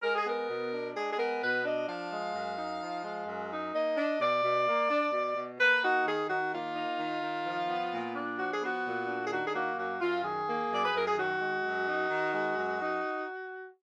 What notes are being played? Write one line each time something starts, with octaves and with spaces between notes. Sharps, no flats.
G#3 A#4
G#4
B3 A#4
B2
D4
G#3 G#4
G#4
B3 A#4
B2 B4
D4 D#5
F3 F5
G#3
F#2
D#4
F3
G#3
F#2
D#4
A#3 D#5
D4
B2 D5
B2
A#3
D4
B2
B2
A#3 B4
D#4 F#4
D#3 G#4
D#3 F#4
A#3 F4
D#4
D#3
D#3
F3
B3
A#2
D4
F3 F#4
G#4
B3 F#4
A#2
D4
G#4
D#3 F#4
G#4
A#3 F#4
F#2 F#4
F#2 F4
D#3 G#4
A#3
F#2 D5
B4
F#2 A#4
G#4
D#3 F#4
G#3
F#2
D#4
D#3
G#3
F#2
D#4